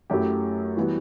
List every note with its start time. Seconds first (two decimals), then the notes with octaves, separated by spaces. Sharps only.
0.10 F#2 F#3 A3 E4 G4
0.77 E3 G3 B3 F#4